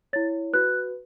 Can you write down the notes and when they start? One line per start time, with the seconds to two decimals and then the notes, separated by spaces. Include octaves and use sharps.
0.13 E4 C#5 A6
0.53 F#4 B4 F#6